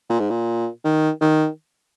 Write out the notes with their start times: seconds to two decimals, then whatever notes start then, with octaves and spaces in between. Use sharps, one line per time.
0.10 A#2
0.20 G#2
0.30 A#2
0.84 D#3
1.21 D#3